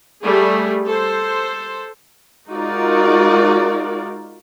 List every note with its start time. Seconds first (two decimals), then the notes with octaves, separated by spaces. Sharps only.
0.23 G3 A3 G#4
0.87 A4 C5
2.49 G#3 D#4 F4 F#4 A#4 D5